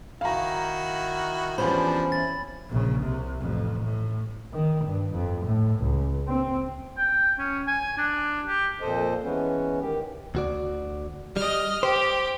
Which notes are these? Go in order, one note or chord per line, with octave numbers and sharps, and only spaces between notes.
D#3 E4 F#4 F5 A#5
E2 F3 G3 C#4 D4 C5 B5
E4 A6
A#1 C#3
C2 C3
A1 F2
A2
D#3
G2
F2
A2
C#2
C4
G5
C#4
G#5
D4
G4
F2 A#2 A4 C5 D#5
E3 G#3 B3 C#4
D#3 G4
D2 F#4 D5
G3 D#5 F6
G4 C5